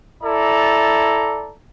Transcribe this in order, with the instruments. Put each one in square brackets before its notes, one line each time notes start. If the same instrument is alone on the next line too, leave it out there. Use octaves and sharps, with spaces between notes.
[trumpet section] E4 A4 D5 A#5